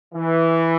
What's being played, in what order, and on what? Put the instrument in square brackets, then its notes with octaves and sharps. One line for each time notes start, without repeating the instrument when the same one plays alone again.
[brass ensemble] E3